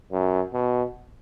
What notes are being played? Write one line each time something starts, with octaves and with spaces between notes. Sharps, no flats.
F#2
B2